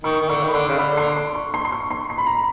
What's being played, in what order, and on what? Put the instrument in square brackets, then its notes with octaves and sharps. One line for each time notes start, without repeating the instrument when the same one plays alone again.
[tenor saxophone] D#3 [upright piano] C#6
[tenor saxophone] D#3
[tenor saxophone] D3 [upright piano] C#6
[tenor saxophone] D#3
[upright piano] B5
[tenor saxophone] D3 [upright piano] C6
[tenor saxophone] C#3
[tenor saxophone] D3 [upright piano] B5
[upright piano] C6
C6
C#6
C6
C6
C#6
C6
C6
B5
A#5
B5